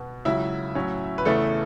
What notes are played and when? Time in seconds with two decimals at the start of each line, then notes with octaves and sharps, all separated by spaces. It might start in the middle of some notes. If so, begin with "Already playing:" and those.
Already playing: B2 B3
0.25 C#2 C#3 F#3 E4 E5
0.75 A2 F#3 C#4
1.18 B4
1.25 E2 C#3 E3 A3 B3 A4